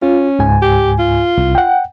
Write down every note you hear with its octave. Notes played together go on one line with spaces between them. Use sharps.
C#4 F4
C#2 G#2 G#5
G4
F4
C2
F#5 G5